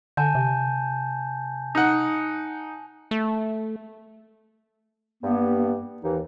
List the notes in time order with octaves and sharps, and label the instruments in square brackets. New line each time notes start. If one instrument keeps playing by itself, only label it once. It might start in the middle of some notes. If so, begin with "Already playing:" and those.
[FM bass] D3 [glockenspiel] G#5 A5 G6
[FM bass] C3
[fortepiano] D#4 F#5
[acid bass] A3
[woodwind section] G2 A#3 B3
D#2 E3 D#4